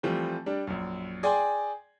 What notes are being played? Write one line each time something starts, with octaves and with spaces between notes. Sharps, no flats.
E3 F3 G3 A3 C4
G3 D4
A#1 F#2
G#4 D5 G5 G#5 C6